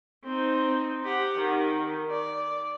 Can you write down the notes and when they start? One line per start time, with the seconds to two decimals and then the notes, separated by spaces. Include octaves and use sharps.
0.24 C4 D#4
1.04 G4 F#5
1.38 D#3
2.10 D5